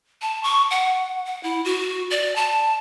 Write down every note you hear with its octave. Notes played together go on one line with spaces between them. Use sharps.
A5
C#6
F#5
F#5
E4
F#4
D5
A5